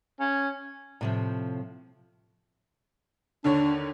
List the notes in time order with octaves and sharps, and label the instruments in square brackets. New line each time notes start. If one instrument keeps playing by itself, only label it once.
[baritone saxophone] C#4
[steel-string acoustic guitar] A2 C3 F3
[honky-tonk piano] D#2 D3 C#5 [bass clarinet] D4